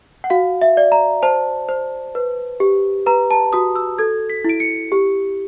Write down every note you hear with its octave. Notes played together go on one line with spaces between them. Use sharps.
F#5
F#4 F5
E5
D5
A#5
C5 A5
C5
B4
G4
B4 A#5
A5
F#4 D#6
E6
A4 G#6
B6
E4 D7
C#7
G4